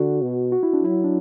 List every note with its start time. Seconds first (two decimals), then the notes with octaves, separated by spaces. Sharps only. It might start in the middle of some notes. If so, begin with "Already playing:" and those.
Already playing: D3 F#4
0.22 B2
0.52 F#4
0.63 E4
0.73 D4
0.83 F#3 E4
1.04 D4